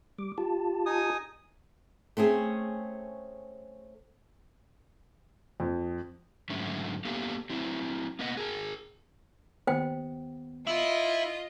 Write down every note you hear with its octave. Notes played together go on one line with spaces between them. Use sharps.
G3 D6
F4 G4 A5
D#4 G#5 D#6
A3 C4 C#4 G#4
F2
G#2 D3 F#3 A3 C#4
A#3 B3 G4 A4 F5
F#3 C4 E4
A#3 B3 D#5 F#5
G#4 A#4
D#2 B3 C5 G5
E4 F4 D#5